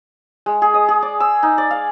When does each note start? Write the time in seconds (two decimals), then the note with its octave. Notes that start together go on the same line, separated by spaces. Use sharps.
0.46 G#3
0.62 G#4
0.74 D#5
0.88 G#4
1.02 D5
1.20 E6
1.43 D#4
1.58 D5
1.71 F5